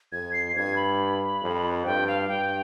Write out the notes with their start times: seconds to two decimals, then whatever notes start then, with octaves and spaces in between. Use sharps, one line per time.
0.12 F2 G#6
0.33 C7
0.56 G2 G#6
0.76 B5
1.42 F2
1.85 G2 G5
2.07 F5
2.28 G2 G5